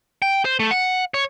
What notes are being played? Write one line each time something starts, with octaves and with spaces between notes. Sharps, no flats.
G5
C5
A3
F#5
C#5